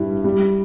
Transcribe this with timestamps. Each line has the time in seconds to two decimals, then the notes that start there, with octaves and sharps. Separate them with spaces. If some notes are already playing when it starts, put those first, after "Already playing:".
Already playing: G2 G3 E4
0.24 G3